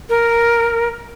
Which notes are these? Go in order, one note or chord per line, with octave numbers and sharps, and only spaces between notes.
A#4